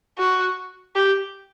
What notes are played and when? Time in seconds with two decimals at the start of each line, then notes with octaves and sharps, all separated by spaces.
0.19 F#4
0.95 G4